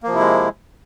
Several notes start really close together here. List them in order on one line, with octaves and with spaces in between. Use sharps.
A#3 F3 C3 E4 G#3